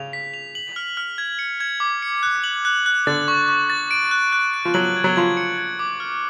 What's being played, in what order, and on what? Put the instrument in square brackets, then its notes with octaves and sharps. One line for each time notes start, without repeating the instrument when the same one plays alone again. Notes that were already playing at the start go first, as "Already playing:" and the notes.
Already playing: [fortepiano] C#3 [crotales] F7
[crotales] B6
F7
F#7
F6
F6
G#6
C#7
G#6
D6
C#7
F#6
F#7
F#6
F#6
[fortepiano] D3 [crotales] A6
[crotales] C#6
C#6
A6
D7
F#6
F#6
D7
[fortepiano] F3
[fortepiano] F#3 [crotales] F#7
[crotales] G#6
[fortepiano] F#3
[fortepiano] F3 [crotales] G#6
[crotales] C#7
G#6
D6
F6